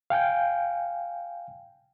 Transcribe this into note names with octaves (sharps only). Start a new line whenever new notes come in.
F5 G5 G#5 G6